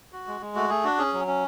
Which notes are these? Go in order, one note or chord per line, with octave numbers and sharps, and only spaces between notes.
F#4
G#3
G#3
A3 F#4
A3 G#4
D4 F#4
C#4 G#4
F#3
C#4